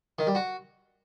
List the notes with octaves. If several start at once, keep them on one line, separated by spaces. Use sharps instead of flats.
D#3
G3
F#4